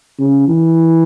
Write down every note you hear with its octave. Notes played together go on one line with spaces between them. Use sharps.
C#3
E3